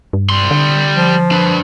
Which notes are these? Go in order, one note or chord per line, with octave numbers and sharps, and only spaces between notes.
G2
G3 C6
D3
F3
D4 B4